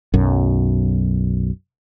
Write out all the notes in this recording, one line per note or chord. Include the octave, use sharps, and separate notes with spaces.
B1 F#2